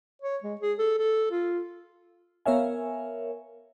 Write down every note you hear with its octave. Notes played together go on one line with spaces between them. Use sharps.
C#5
G#3
G#4
A4
A4
F4
B3 A#4 C#5 E5 F5 G#5